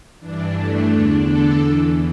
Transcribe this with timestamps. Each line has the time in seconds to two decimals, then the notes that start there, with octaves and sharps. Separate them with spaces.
0.20 G2 E3 D4
0.55 A3
0.90 E2 D3 D4
1.25 A4
1.61 E2 E3